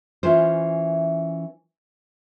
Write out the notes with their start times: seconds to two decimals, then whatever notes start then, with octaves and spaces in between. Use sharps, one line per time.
0.23 E3 C#4 F4 B4 C5